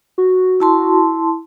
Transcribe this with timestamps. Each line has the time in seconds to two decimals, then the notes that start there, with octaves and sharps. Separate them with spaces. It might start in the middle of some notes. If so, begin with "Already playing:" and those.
0.18 F#4
0.60 E4 A5 C6